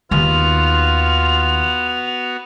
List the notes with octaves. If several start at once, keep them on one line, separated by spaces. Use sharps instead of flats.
D#2 D#3 B3 F4 F#4 F7